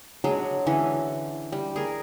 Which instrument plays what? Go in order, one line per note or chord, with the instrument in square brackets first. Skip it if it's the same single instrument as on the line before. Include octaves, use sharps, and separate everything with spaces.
[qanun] F#3 G#3 D4 G#4
D3 E3 C#4
G3
G#4 A#4